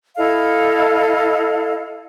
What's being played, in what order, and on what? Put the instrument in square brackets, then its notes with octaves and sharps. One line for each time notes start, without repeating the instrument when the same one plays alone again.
[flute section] E4 A4 D#5 F5